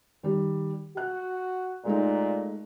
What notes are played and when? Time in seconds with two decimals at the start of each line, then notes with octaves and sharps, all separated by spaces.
0.23 D#3 G3
0.97 F#4 F#6
1.85 A#2 G#3 A3 D#4